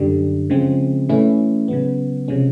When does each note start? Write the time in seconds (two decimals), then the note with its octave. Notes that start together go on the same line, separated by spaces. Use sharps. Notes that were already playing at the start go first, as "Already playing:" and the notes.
Already playing: F#2 D3 G3
0.50 C#3 F3 G#3 C4
1.09 A2 E3 A3 C#4 E4
1.68 C#3 F#3 B3
2.28 C3 F3 G#3 C#4